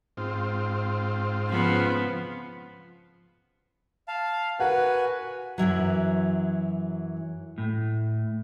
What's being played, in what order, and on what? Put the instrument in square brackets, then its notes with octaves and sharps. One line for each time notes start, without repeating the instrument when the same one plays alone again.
[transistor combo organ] G#2 C4 F4
[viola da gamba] C#3 F3 B3
[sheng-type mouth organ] F5 [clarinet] A5
[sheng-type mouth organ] F#4 G#5 [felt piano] A#4 F#5 [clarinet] B4
[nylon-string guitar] F#2 B2 E3 F#3
[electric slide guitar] A2